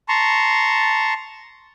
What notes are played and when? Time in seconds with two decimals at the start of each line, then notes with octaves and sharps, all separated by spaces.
0.09 A5 A#5 C6 C#6